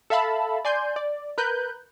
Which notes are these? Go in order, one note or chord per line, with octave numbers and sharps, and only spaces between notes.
A4 E5 F5 A5 B5
D5 G#5 C6 G6
D5
A#4 B4 F#6 G6